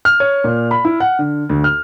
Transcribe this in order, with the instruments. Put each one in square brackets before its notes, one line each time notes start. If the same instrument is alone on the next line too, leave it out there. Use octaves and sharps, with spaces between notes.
[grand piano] F6
C#5
A#2
B5
E4
F#5
D3
D2
F6